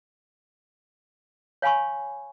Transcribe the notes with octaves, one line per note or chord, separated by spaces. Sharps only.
C#5 F5 G#5 B5 C#6